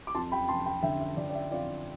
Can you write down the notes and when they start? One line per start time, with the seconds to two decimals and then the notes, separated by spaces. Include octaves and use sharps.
0.07 D6
0.15 F2 A5 C6
0.32 G5 B5
0.48 F1 A5 C6
0.66 G5 B5
0.83 D3 E5 G5
1.00 E5
1.17 D3 D5
1.30 D5
1.34 E5
1.51 F2 D5 F5